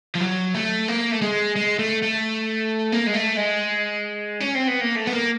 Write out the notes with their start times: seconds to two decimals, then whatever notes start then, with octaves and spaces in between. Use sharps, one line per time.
0.15 F3
0.20 F#3
0.55 A3
0.88 A#3
1.12 A3
1.22 G#3
1.56 G#3
1.79 A3
2.02 A3
2.92 A#3
3.07 G#3
3.14 A3
3.37 G#3
4.41 C#4
4.55 C4
4.68 B3
4.81 A#3
4.96 A3
5.07 B3
5.13 A#3